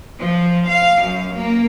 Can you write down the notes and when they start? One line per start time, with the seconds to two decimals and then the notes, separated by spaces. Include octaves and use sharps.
0.20 F3
0.68 F5
1.02 F#2
1.34 A#3